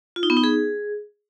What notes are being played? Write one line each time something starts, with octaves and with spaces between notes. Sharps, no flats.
F4
D#4
B3
D#4
G#4